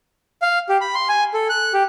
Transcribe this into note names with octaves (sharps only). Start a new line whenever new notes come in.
F5
G4
B5
C6
G#5
A4
F#6
G4